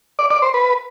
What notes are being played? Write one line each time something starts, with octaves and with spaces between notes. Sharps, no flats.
D5
D5
C5
B4